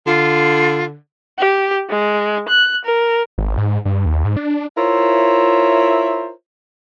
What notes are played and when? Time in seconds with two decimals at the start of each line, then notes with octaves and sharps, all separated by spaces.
0.06 D3 F4
1.38 G4
1.90 G#3
2.49 F#6
2.85 A#4
3.38 G#1
3.57 G#2
3.85 G2
4.06 D#2
4.24 G#2
4.37 D4
4.77 E4 F4 A#4 C5 C#5 E5